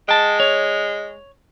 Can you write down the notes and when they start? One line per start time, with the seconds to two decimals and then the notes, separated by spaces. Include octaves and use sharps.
0.09 G#3 G5 A5
0.40 C#5